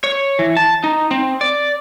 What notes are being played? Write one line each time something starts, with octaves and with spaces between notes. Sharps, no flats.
C#5
E3
A5
D#4
C4
D5